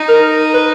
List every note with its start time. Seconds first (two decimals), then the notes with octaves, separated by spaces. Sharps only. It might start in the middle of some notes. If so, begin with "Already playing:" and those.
Already playing: D#4
0.09 A#4
0.54 B4